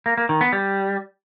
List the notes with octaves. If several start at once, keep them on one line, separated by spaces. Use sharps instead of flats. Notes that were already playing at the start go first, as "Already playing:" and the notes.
A#3
A#3
D#3
B3
G3